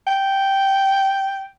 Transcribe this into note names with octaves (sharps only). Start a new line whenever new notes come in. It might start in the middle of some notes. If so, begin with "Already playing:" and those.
G5